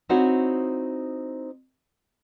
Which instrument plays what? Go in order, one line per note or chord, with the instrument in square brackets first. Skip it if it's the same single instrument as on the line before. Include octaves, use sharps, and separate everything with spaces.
[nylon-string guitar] C4 D#4 E4 F#4 C5 C#5